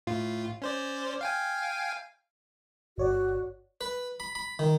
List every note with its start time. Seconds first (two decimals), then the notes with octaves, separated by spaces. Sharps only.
0.07 A2 F4
0.62 C#4 C5 D5
1.21 F5 G5 G#5
2.98 G1 F#4 C#5 D5
3.81 B4
4.20 B5
4.35 B5
4.59 D#3